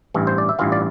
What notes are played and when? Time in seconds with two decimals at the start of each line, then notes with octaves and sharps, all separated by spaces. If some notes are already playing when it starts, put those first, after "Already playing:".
0.14 A1 G2 E3
0.27 C5
0.38 D5
0.49 E5
0.59 A1 G2 E3 F4 F5
0.72 D5